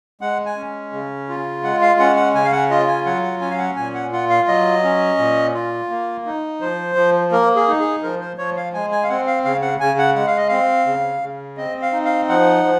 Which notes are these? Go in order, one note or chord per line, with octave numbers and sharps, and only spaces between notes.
G#3 F#5
G#5
C#4
C#3
F4
G#3 F#5
F5
C#4 F#5
F#5
C#3 G#5
F5
F#5
F4 D#5
G#5
F#3 F#5
F#5
C#4 G#5
F5
F#5
A#2 G#5
F#5
F4 F#5
F5
F#3 D#5
C#4
A#2
F4
A#3
D#4
F3 C5
F3
A#3 A#4
G#4
D#4
G#4
F3 A#4
C5
F3 C#5
F5
G#3 G#5
G#5
F5
C4 F#5
F5
C#3 F5
F#5
C#3 G#5
F#5
G#3 F#5
F5
D#5
C4 F5
C#3
C#3
C4 D#5
F5
D#4
F5
F3 F#5
F3